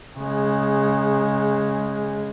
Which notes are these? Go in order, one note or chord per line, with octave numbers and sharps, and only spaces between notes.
C#3 G#3